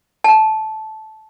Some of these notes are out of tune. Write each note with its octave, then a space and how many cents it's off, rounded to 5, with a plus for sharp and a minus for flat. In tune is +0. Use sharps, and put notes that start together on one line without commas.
A5 -15